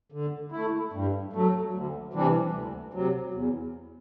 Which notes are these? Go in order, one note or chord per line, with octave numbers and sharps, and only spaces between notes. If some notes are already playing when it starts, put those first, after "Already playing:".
D3
A3 E4
G2
F#3 A3
D2
C3 E3 G3 D4
D2
C3 F#3
E2